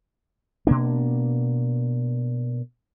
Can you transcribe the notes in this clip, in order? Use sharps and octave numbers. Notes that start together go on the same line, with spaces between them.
B2 A#3 D4